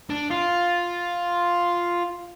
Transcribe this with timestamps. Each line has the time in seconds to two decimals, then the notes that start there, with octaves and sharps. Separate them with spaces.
0.10 D4
0.30 F4